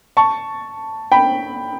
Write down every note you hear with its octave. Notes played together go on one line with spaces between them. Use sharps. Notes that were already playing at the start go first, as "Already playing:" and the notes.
A5 C#6
G5 B5